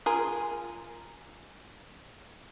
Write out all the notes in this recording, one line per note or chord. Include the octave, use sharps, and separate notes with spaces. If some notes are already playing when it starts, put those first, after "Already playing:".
F4 G#4 A#4